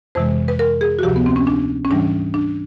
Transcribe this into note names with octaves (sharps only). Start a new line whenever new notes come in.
F2 C3 E3 G#3 C5
B4
A#4
G#4
F#4
D2 C3 F3 G4
B3
C4
C#4
D4
C#4
G#2 E3 G3 D4
D4